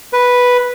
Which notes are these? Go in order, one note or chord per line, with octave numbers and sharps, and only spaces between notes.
B4